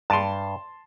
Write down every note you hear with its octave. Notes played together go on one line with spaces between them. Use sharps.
G2 A5 C6